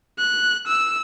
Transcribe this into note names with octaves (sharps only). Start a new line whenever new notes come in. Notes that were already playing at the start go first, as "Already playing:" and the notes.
F#6
E6